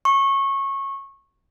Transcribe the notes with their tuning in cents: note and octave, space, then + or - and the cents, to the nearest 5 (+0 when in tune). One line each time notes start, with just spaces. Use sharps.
C#6 -20